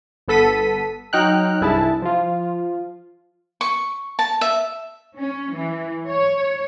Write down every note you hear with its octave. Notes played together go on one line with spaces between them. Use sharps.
G1 B3 A4 B6 D#7
F#3 D#4 G5 F6 F#6
C2 G2 E4 G#4 A5
F3 F4
C#6
A5
E5
C#4
E3
C#5